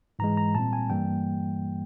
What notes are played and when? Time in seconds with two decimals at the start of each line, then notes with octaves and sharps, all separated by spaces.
0.19 G#2 E3 G#3 A#5
0.37 A#5
0.55 A#2 G3 C4 A5
0.73 G#5
0.90 G2 E3 G3 A#3 G5